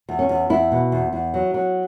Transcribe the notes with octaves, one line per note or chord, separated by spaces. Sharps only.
E2
C#4
E2
E2 E4
B2
E2
E2
F#3
F#3